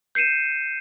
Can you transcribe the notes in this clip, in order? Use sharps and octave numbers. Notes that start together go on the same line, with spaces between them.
G6 C7 C#7 D#7 E7